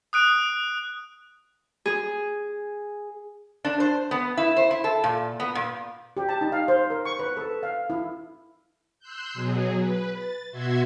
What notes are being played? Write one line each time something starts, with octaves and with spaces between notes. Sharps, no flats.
D#6 F#6 D7
G#4
D4
C5
B3
E4
C5
E4
A4
A#2
B3
A#2
G4
A5
D#4
F5
C5
A#4
C#6
B4
A4
F5
E4
C6 E6 F#6 G6
B2 F#3 G#4
B4
A6
B2 F#4 E5 C6 G#6